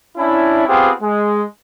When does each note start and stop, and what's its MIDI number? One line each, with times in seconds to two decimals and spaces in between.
0.17 0.65 61
0.17 0.65 62
0.17 0.65 64
0.67 0.91 59
0.67 0.91 60
0.67 0.91 65
0.67 0.91 67
0.67 0.91 68
1.02 1.43 56